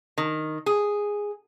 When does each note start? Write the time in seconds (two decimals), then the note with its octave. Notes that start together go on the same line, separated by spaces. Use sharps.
0.18 D#3
0.66 G#4